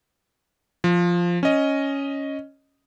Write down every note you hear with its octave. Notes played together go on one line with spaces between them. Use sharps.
F3
C#4 D#5